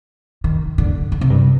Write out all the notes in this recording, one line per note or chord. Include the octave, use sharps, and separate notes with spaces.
D#3
D3
D3
C3
G2